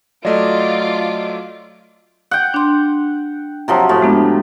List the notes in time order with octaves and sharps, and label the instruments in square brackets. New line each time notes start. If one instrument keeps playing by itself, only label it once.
[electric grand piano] F#3 A3 [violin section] F4 D6 [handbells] D5 D#5
[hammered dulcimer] F#5 G5
[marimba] D4 C6
[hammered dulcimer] C3 F3 F#3
[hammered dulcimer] A2 [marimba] C#6 D#6
[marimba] G#3 B3 D4